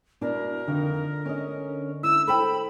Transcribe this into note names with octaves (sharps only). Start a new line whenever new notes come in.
B2 D4 E4 A#4
F2 D3 D#3
C#4 D#5
E4 E6
A4 C5 G5 B5